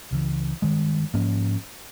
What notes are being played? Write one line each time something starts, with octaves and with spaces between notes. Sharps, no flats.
C#2 C#3 E3
G2 D#3 G#3
G#2 F3 A#3 C#4